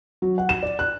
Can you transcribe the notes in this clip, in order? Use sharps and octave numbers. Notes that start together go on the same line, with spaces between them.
F#3
F#5
E7
D5
F#6